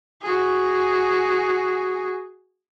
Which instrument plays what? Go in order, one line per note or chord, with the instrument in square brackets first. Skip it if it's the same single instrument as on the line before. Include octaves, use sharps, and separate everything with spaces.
[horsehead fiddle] F#4 G#4